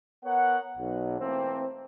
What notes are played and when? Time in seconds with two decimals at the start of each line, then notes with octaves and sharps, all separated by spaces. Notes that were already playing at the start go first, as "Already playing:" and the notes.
0.24 B3 A#4 C#5 F#5
0.77 B1
1.20 E3 A3 A#3 C4